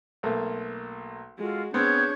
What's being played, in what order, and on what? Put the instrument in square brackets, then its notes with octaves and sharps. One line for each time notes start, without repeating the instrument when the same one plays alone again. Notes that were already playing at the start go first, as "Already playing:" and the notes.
[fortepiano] B1 A3 A#3
[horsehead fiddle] G#3 F#4 [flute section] F4 A4
[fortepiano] B3 C4 [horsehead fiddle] D4 C#5 [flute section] G#4 G6 G#6